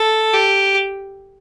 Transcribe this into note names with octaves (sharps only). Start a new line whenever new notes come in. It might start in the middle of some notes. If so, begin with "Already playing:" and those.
Already playing: A4
G4